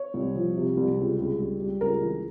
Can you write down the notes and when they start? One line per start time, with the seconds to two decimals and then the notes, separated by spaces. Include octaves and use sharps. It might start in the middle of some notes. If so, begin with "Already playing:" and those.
Already playing: C#5
0.14 C2
0.35 F3
0.57 C3
0.77 C2
0.98 C#2
1.18 C#2
1.39 G3
1.60 G3
1.81 C#2 A#4
2.02 E3